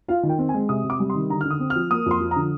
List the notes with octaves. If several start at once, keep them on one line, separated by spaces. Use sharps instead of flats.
F4 F5
D#3
G5
C4
G#5
G#3
C3 D#6
C3
D6
G3
C6
D#3
D3 A#5
F6
D3
D#6
C4
F6
F3
A#3 D#6
F2 C6
F3
A#5
D3